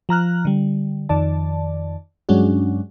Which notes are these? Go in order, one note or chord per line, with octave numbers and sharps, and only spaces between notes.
F3 A#5 F6 F#6
D3 G3
F2 D#3 D5 A5
G2 F#3 G#3 C#4 D4 F#4